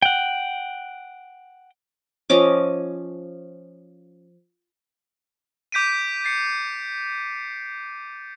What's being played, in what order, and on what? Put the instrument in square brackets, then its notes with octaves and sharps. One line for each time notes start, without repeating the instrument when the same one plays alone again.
[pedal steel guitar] F#5 G5
[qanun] F3 C#4 D#5 D6
[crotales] D6 G6 B6 D7 D#7
A6 C7 C#7